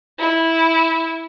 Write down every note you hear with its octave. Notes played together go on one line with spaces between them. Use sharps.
E4